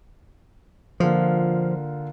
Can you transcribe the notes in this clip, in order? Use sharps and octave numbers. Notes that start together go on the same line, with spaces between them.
D3 F3 A#3 F4